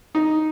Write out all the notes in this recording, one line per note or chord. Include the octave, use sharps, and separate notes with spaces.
D#4